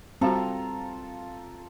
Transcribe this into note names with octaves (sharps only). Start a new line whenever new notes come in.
G3 C4 F4 F#4 A4 A#5